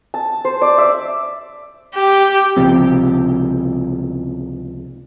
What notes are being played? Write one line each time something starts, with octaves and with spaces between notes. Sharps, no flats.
A5
C5
D5
E5
G4
C#2 C3 F3 C4